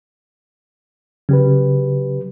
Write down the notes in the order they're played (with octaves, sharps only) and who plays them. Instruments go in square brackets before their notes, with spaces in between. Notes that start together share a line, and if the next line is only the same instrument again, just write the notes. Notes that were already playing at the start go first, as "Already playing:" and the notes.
[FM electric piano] C#3 [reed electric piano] F#3 G4 B4